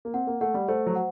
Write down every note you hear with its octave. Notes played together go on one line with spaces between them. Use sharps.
A#3
C4 F#5
A#3
A3 F#5
G3
A3 C5
F#3
F#5